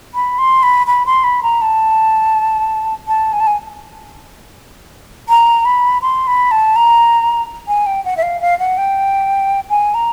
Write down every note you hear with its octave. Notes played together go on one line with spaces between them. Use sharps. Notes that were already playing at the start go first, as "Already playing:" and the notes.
B5
C6
B5
B5
C6
B5
A#5
A5
A5
G#5
A5
G#5
A#5
B5
C6
B5
A5
A#5
G#5
G5
F#5
E5
F5
F5
F#5
G5
G#5
A#5